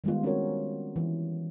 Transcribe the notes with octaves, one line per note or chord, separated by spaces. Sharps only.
D#3 G3 G#3 B3 F4
C4 C#4 F4 F#4 A#4 C#5
E3